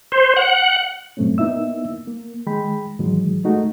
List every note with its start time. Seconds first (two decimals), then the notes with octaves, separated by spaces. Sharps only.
0.12 C5
0.36 F#5
1.17 G2 A#2 F#3 A3 C4 C#4
1.38 A#3 B3 D#4 E4 E5 E6
2.08 A#3
2.46 D#3 G#3 G5 B5
2.99 G#2 D#3 E3 F#3 G#3
3.44 G#3 A3 D#4 F#4 A4